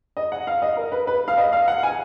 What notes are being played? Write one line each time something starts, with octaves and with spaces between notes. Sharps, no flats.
D#5
F#5
F5
D#5
A#4
B4
B4
F5
D#5
F5
F#5
G#5